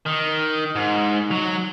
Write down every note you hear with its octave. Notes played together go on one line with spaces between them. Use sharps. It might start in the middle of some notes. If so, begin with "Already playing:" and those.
D#3
G#2
F#3